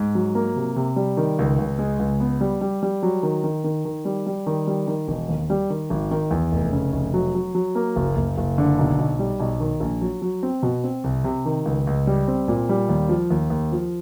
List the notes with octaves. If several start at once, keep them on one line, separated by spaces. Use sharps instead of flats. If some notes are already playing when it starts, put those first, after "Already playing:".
Already playing: G#2
F#3
A#3
C3
C3
G3
D#3
C#2
C#2
G#3
C#2
B3
G3
G3
G3
F#3
D#3
D#3
D#3
D#3
G3
G3
D#3
G3
D#3
E1
D#2
G3
D#3
G#1
D#3
E2
F1
C#3
F1
F#3
F#3
F#3
A#3
F#1
F#1
F#1
D3
B1
B1
G3
B1
D#3
A#1
F#3
F#3
C4
B2
C4
C2
C3
D#3
C#2
C#2
G3
C4
A#2
G3
D#2
F3
D#2
D#2
F3